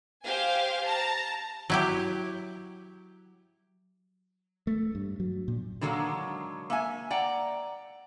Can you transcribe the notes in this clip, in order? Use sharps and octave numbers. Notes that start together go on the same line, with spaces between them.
G4 C5 F5 G#5
A5 A#5
F#3 E4 G4
A3
G2
F#3
A#2
D3 D#3 F#3 G#3 A#3
A#3 E5 G#5
D5 F#5 G5 A#5